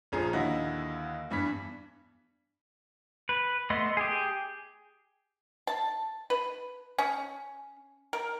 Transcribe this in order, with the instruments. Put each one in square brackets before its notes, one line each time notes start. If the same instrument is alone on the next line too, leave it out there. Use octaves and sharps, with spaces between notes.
[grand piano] A#1 F3 C#4 G#4 A#5
D#2 D3 E4 F#4 D#5
E2 G2 E3 B6
[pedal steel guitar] B4
A3 B3 D#5 C6
G4 G#4
[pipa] A5
B4
C#4
A#4